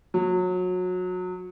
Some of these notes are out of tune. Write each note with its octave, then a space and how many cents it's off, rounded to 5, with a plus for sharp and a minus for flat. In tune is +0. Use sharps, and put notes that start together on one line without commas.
F#3 -25